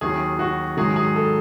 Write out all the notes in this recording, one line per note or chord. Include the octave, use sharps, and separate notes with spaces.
D#2 D#3 F#3 G#4
F#4
G#2 D#3 F#3 G#4
G#4
A4